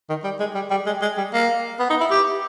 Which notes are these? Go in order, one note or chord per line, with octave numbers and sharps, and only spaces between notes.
D#3
G3
G#3
G3
G3
G#3
G#3
G3
A#3
B3
D#4
E4
G4